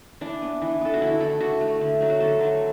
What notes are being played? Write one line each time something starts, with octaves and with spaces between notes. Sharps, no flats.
E3 D4
B3
E3
B3 A4
F#4
D3 E4
A3 A4
D3 F#4
A3
D3
F#3 A3
F#4
D3 A4
F#3 A3